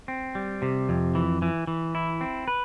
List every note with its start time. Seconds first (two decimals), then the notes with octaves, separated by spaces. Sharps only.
0.08 C4
0.35 G3
0.62 C3
0.89 F2
1.15 E3
1.42 E3
1.67 E3
1.95 E4
2.21 C4
2.48 B4